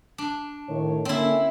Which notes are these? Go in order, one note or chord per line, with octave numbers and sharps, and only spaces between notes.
D4
A2 D#3 C#5
D3 A#3 C4 C#4 E4